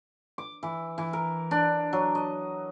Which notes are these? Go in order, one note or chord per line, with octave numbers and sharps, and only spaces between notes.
D6
E3
E3
A#4
D4
F#3
D#5